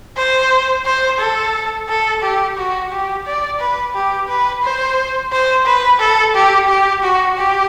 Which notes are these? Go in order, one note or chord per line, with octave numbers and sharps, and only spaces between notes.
C5
C5
A4
A4
G4
F#4
G4
D5
B4
G4
B4
C5
C5
B4
A4
G4
G4
F#4
G4